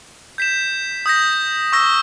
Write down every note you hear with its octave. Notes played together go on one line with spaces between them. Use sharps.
G6 B6 E7
D#6 G6 A#6
C#6 E6 A#6